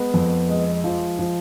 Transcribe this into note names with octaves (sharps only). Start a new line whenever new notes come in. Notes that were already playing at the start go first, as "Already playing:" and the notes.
Already playing: G#3 B3
F2
G#3
F3
F3